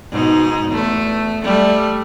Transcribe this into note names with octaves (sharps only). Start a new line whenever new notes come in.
G#2 B2 D#4
E2 A3
G3 A3